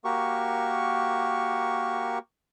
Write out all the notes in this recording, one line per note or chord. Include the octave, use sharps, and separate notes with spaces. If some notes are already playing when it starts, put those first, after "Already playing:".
A#3 F#4 G4 A#4 C#6